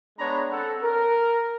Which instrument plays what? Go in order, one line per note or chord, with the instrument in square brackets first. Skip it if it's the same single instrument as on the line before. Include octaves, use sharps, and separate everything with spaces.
[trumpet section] G#3 B3 D4 C#5 A#5 B5
C4 A4 F#5
A#4